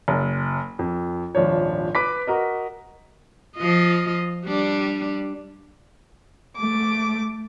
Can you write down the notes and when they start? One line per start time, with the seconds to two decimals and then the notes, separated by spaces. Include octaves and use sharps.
0.08 F#1
0.79 F2
1.35 D#1 G#1 F3 D4 C#5
1.95 B4 D6 B6
2.27 F#4 A#4 D#5
3.57 F3 F4 D#5
4.46 G3 D4
6.55 A3 D6